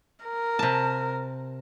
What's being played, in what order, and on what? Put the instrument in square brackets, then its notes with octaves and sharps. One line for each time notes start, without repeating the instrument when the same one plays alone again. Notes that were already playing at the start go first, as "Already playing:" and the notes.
[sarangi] A#4
[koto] C3 A5